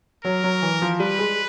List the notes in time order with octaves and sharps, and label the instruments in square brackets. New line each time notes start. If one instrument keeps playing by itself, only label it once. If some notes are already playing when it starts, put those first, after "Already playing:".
[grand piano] F#3 [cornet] A#4
[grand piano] F#3
E3
F3
[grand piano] G3 [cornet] B4
[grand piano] G#3